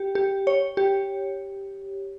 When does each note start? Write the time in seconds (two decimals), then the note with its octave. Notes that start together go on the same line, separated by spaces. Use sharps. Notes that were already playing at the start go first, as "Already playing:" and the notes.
Already playing: G4
0.15 G4
0.47 C#5
0.77 G4